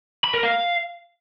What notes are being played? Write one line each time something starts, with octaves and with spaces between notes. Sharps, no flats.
B5
A#4
F5